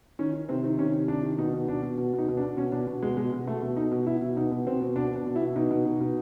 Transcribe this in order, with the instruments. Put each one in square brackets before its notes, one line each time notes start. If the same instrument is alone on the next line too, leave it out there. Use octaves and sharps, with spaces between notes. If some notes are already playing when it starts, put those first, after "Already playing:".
[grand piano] D#3 C#4
D#3
C3 C4
D#3
C3 C#4
C3
D#3 D4
D#3
B2 D#4
B2
B2 D4
B2
B2
B2 D#4
B2
D4
B2
B2 C#4
B2 D4
B2
B2 G#3
B2 G#3
B2
B2 A3
B2
B2 D#4
B2
B2 E4
B2
B2 D#4
B2
B2 C4
B2
B2 D4
B2 D4
B2
E4
B2
B2 D#4
B2
B2
B2